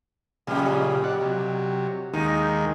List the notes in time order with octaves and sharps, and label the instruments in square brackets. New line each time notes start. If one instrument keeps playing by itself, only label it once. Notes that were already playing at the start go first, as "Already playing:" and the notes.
[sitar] F2 G3 [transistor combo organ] A#2 C#3
[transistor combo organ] D5 F#5
C3 F#3
[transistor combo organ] D#2 D#3 G#3 [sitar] D#4